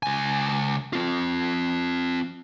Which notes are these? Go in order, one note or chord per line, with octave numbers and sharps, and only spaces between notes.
C#2 G#5
C4 F4